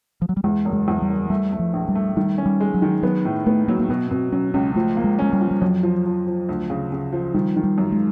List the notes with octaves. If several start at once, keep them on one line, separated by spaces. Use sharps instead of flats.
F3
F#3
G3
E2 G#3
F#1
G#3
E2
G3
F#1
G3 A3
A3
F3
A#1
G3
A3
D#3 G3
C#4
G3
G#3
F#3
D#3
F#3 B3
A2
A3 B3
F#3 A#3
A#3
B2 B3
B2 C4
F#3 C#4
C#2 C#4
F3 A3
A#3
G#3
G#3 C#4
G3
F3
G3
F2 F#3
F3
F3
F3
D2
C#3
C#3
F3
D#3 G3
D#3
G3
F#2
G#3